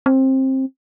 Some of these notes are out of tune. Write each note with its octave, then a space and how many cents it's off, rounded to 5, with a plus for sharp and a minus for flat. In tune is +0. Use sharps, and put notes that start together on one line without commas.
C4 +20